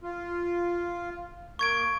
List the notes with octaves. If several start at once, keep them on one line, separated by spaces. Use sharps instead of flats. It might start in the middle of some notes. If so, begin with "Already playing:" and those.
F4
A#3 C#6 G#6 D7